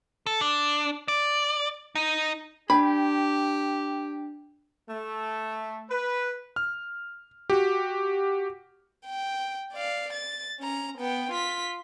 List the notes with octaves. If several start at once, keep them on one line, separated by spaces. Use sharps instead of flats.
A4
D4
D5
D#4
D4 G4 G5 B5
A3
B4
F6
F#4 G4
G5
D5 F5
A6
C#4 A#5
B3 G5
F4 B6